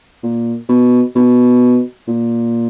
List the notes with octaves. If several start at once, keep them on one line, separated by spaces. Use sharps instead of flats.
A#2
B2
B2
A#2